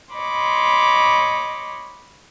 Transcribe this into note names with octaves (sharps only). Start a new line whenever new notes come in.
C#5 D#5 B5 C6 D6